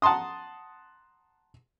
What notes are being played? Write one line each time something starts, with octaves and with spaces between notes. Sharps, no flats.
F#5 A5 A#5 C6 D#6